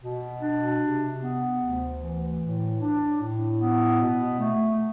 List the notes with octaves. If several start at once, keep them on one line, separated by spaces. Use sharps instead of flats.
B2
D4
C3
B3
D2
E3
A2
D4
A2
B3
B2
A3